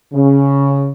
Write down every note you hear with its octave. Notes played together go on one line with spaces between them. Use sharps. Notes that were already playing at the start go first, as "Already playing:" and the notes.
C#3